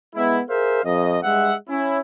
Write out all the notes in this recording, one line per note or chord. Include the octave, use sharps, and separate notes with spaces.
G#3 B3 E4
G#4 A#4 C5 E5 F5
F2 D#5
G2 G#3 E5 F#5
C#4 E4